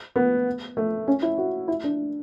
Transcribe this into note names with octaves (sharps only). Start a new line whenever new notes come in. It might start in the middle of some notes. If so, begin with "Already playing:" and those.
B3
A3
C#4
E4
F#4
E4
D4